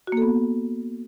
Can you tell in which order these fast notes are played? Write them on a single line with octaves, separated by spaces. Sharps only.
F#4 A#3 A4 B3